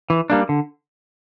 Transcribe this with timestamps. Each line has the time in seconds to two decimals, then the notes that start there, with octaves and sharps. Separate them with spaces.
0.10 E3
0.30 G3 A#3 D4
0.49 D3